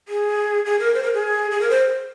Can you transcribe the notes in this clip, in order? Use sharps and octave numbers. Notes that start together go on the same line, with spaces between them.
G#4
G#4
A#4
C5
A#4
G#4
G#4
A#4
C5